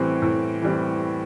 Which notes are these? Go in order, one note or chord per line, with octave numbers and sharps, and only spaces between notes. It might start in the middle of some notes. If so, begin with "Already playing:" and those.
Already playing: A2 E3 G3 C4
A2
E3 G3 C4